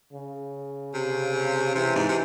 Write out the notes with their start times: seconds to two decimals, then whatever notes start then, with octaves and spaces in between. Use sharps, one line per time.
0.13 C#3
0.94 C3
1.75 C3 E3
1.95 G#2
2.08 C3